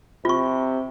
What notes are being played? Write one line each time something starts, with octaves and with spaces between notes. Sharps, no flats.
C3 F4 C#6